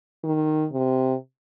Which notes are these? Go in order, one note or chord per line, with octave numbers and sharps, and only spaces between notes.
D#3
C3